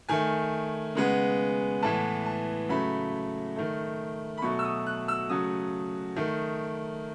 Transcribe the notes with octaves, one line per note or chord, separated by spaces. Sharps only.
D#3 A3 G#5
C#3 G#3 B3
A2 E3 B3 A5
A5
C#3 F#3 A3 B5
D#3 A3
B5
B2 F#3 A3 C#6
E6
D#6
F#6
E6
C#3 F#3 A3 D#6
D#3 A3